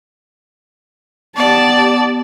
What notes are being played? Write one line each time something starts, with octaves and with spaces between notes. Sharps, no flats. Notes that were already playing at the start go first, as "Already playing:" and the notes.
B3 G4 D5 A5